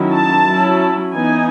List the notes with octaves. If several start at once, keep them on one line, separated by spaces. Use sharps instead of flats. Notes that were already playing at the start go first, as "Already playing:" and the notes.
Already playing: D#3 F#3 C#4 E4
A5
F#3 C#4 E4
E3 B3 D#4 G#5